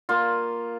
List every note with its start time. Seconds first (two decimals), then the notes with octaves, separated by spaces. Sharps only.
0.09 A#3 F4